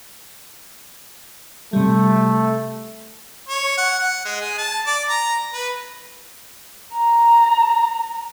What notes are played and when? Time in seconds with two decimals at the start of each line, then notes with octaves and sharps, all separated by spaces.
1.73 C3 G3 A3
3.49 C#5
3.78 F#5
3.99 F#5
4.25 G#3
4.41 G#4
4.58 A5
4.87 D5
5.09 A#5
5.54 B4
6.93 A#5